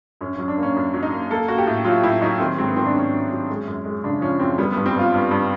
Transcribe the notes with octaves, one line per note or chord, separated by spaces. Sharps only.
F#2 C#4
F#3 C#4
D4
A#3 C#4
F#2
F#3
D#4
A#3
A#3 A4
A#3 F#4
G4
A2
F#3 F4
A2 E4
F#3 D#4
D#3 C4
G#2 C4
B3
D#3 C4
D4
G#2 C#4
F#3
F#3
G#3
F#2
G#3
C#3 D4
F3 C#4
F#2 C4
G3 B3
G2 B3
C4
G2 F4
G2
G2